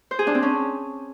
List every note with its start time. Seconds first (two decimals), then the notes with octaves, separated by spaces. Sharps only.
0.11 C5
0.19 G#4
0.27 D4
0.35 C4
0.43 C#4